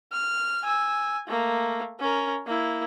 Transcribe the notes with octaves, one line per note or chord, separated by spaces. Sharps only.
F6
G#5 E6
A3 A#3
C#4 A#4
A#3 E4